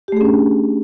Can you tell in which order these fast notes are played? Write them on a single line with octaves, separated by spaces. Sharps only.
G4 A3 G#4 C#4 D4